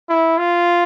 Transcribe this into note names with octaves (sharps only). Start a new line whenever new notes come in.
E4
F4